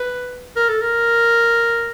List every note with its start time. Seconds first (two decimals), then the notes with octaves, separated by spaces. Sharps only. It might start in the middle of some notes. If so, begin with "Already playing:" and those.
Already playing: B4
0.56 A#4
0.69 A4
0.81 A#4